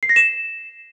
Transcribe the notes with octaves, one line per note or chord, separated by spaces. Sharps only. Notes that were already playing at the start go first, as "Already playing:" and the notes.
C7
A#6
E7